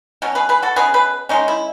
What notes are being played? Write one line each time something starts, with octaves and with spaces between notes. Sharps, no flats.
B2 F#3 C#4
G#4 B4
G#4 B4
F#4 A4
B2 F#3 C#4 G#4 B4
G#4 B4
D#3 G#3 C#4 D#4
E4